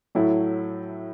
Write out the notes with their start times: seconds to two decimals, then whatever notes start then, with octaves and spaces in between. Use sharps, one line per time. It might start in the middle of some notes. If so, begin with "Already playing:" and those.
0.15 A2 F#3 A3 E4